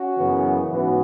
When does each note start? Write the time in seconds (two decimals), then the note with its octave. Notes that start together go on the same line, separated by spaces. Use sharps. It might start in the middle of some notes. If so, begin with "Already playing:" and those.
Already playing: C#4 F#4
0.16 F#2 C#3 E3 B3
0.71 G#2 E3 B3 C#4 F#4